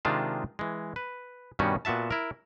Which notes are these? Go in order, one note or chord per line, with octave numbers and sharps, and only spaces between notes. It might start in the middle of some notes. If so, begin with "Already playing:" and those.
C3 D#3 G#3 D4 F4 A5
E3 G#3
B4
G2 B2 D#3 G3 C#4 F#4
A#2 B3 F#4 E5 A5
E4 A#4